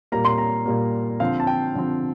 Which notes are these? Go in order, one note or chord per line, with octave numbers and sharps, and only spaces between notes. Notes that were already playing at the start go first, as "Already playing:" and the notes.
A#2 G3 A#3 A#5
C6
A#5
A#2 G3 A#3
D3 F3 C4 F5
A5
G5
D3 F3 C4